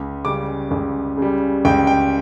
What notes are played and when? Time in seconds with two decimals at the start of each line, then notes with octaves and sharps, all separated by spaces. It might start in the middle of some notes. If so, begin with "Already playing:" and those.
Already playing: C#2
0.25 C#3 G3 D6
0.71 C#2
1.17 C#3 G3
1.65 C#2 G5
1.87 G5